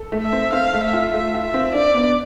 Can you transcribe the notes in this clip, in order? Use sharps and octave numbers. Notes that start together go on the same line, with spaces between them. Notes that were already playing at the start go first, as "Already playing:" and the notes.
Already playing: A4
A3
E5
C4
C4 F5
A3
E5
F4
A3 E5
F4
E5
C4
D4 D5
B3